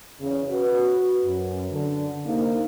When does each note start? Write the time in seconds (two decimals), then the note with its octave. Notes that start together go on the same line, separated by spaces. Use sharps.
0.20 E2 C#3
0.49 F#4 B4
1.24 F#2
1.71 D3
2.25 C3 A#3 D#4